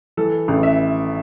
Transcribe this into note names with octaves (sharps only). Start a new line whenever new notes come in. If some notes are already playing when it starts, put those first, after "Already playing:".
E3 A4
A1
E5